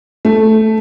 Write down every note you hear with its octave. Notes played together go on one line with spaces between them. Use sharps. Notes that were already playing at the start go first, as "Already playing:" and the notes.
A3